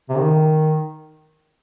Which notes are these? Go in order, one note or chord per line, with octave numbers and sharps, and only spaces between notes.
C3
D#3